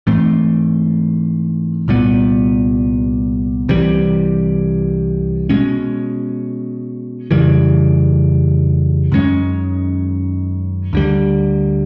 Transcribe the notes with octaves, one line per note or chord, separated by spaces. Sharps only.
G#2 E3 A3 C4
C2 A#2 G3 B3
C2 C3 E3 G3
B2 G#3 C#4
F2 C#3 E3 G3
F#2 D#3 G#3 C#4
D2 D3 G3